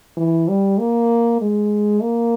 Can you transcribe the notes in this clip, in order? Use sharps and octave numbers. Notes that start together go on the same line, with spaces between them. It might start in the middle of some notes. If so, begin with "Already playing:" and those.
E3
G3
A#3
G#3
A#3